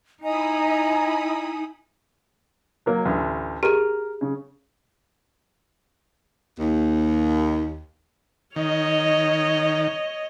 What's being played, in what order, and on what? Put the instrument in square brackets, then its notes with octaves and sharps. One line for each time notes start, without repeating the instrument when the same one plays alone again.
[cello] D#4 [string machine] E4 B5 D#6 [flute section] D#5 A#5 [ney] G#5
[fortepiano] F#3 A#3
A1 D2
[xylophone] G4 G#4 [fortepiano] A#4
[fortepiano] C#3
[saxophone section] D#2
[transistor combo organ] D#3 [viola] C#5 D#5